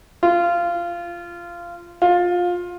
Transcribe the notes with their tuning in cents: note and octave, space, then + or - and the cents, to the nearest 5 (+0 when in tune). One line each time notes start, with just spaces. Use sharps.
F4 -15
F4 +20